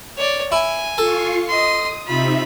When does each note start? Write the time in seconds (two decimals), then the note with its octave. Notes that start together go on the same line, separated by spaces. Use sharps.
0.17 C#5 D5
0.52 E4 G#5
0.98 F4 A4 C#6 C7
1.49 D#5 C6 D#6
2.07 C3 D#4 F4 E5 B5